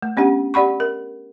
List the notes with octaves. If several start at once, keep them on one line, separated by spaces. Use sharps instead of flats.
A3
B3 C#4 D4 G4 F#5
G4 D5 F#5 B5 C#6
A#4